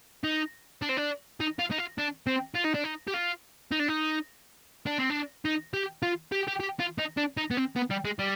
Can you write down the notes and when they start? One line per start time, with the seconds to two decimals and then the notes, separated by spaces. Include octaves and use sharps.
0.24 D#4
0.82 D4
0.89 C4
0.97 D4
1.40 D#4
1.59 F4
1.71 D#4
1.78 F4
1.98 D4
2.27 C4
2.55 F4
2.65 D#4
2.75 D4
2.84 D#4
3.07 G4
3.14 F4
3.71 D#4
3.79 D4
3.88 D#4
4.86 D4
4.98 C4
5.10 D4
5.45 D#4
5.74 G4
6.03 F4
6.32 G4
6.47 G4
6.60 G4
6.80 F4
6.99 D#4
7.17 D4
7.37 D#4
7.51 B3
7.57 C4
7.76 B3
7.90 G3
8.05 G#3
8.19 G3